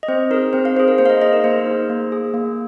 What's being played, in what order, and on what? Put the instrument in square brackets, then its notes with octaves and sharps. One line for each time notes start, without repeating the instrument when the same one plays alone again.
[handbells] D#5
C4 C5
D#4 G#4 A#4
C4 C5
F5
D#4 C5
G#4
A#4
A#3 C5
F5
D#5
D#4 G#4 D#5
A#4
A#3 C5
D#4 G#4
A#3
G#4
A#3